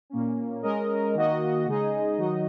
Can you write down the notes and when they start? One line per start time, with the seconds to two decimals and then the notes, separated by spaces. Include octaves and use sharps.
0.10 A#2 A#3 C#4
0.62 G#3 C#4 A#4 D#5
1.14 D#3 A#3 F#4 D#5
1.66 C#3 G#3 D#4 G#4 D#5
2.18 D#3 F#3 D#4 F#4 D#5